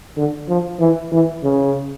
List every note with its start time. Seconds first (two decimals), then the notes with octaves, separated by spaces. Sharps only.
0.17 D3
0.48 F3
0.80 E3
1.12 E3
1.43 C#3